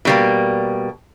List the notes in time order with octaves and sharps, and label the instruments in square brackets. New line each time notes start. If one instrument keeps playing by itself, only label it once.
[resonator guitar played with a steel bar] B2 G3 A#3